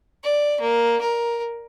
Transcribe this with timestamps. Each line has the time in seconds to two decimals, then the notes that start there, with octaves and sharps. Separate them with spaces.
0.23 D5
0.61 A#3
1.02 A#4